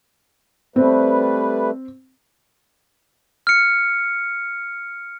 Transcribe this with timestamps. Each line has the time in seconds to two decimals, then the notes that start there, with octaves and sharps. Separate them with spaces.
0.76 G3 A3 C4 B4
3.47 F6 C#7